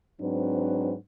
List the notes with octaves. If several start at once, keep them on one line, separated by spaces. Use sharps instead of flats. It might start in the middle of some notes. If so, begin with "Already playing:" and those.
G#2 F#3 C4 D4 B4